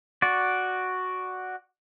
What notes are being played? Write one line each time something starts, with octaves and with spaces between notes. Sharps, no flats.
F#4 D5